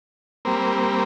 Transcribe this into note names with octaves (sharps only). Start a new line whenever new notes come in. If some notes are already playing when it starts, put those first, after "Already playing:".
G3 A#3 C4